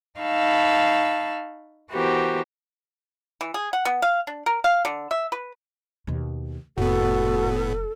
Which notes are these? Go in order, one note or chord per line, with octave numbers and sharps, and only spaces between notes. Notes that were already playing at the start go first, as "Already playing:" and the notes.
D#4 F5 A5 B5 C#6 E6
E3 B3 F#4 G4 A#4 C5
E3
G#4
F#5
B3
F5
D4
A#4
F5
D3
E5
B4
D#2 B2
F1 A2 B3 F#4 A4